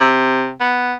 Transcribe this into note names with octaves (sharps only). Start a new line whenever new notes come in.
C3
B3